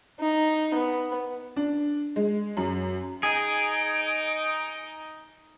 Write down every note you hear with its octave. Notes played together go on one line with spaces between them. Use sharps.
D#4
B3
D4
G#3
F#2
D#4 G#4 D7